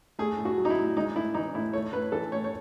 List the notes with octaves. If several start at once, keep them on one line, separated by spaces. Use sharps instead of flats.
A3 G#4
A2
F#4
F#3
D#4
E4
A2
G#3 D#4
A2 E4
E3 D#4
A2 E4
A3 C#5
A2 B4
E3 A4
A2 C#5
C#5